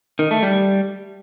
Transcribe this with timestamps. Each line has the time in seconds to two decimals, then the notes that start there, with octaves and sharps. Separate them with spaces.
0.19 D#3
0.31 A3
0.43 G3